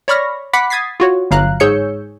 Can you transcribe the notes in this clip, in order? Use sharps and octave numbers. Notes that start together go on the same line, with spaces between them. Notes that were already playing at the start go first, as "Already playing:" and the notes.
C#5 D5 B5 C#6 F6 A#6
F#5 B5 D6 F#6 B6 C#7
D#6 G#6 A6 B6 C7
F4 F#4 C#5
G1 F#3 F5 A#5 F#6
G#2 G#4 C#5 E6 G6 C#7